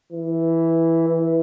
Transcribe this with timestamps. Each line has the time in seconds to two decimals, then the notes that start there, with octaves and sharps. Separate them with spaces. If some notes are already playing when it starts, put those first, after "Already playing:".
0.13 E3
1.09 E3